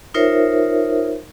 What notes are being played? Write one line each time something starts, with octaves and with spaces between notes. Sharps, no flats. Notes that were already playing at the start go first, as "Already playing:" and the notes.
D#4 F4 A#4 C5 C#5 E5